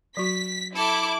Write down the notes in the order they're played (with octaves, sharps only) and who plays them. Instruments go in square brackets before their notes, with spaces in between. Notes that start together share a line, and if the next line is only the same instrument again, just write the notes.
[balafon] F#3 F#4 [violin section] B6
[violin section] E4 D6 [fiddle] A4